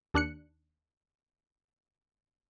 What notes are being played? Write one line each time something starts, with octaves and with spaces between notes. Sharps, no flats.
D#2 D4 F#6 C#7